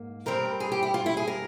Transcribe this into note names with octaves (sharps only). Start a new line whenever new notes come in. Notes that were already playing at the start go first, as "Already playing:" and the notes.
Already playing: G#2 A#3
G2 G3 C4 A#4
G#4
G4
E4
F4
E4
G#4
A#4